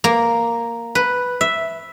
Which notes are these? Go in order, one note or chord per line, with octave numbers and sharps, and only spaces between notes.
A#3
B4
E5